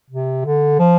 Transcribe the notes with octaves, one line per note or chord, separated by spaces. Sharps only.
C3
D3
F3